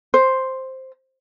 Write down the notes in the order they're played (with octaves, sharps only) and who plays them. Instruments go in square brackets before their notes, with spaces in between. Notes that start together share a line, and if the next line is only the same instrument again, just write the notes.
[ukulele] C5